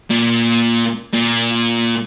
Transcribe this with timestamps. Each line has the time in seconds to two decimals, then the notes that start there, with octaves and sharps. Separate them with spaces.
0.10 A#2
1.14 A#2